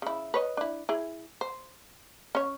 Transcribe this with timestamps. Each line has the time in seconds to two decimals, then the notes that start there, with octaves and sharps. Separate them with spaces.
0.02 C#3 E4
0.34 B4 C#5 D#5
0.57 D4 E4
0.89 E4 G#4
1.41 C5
2.35 C#4 C#5